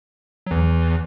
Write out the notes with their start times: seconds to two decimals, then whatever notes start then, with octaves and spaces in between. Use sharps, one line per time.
0.47 F#3
0.51 E2 E3